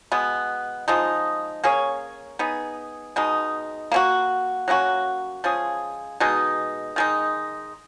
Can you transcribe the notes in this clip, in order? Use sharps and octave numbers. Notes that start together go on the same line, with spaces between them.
B2 G#3 B3
F3 G#3 D#4
A#3 C#4 G#4 C#5
B3 D#4 G#4
B2 G#3 D#4
A#3 C#4 F#4
F#3 A#3 C#4 F#4
F3 G#3 C#4 G#4
B2 G#3 D#4
D#3 G#3 D#4